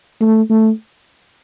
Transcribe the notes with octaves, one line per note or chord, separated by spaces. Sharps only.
A3
A3